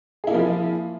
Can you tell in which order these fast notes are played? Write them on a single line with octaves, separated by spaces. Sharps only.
G#4 E4 A#3 F3 F4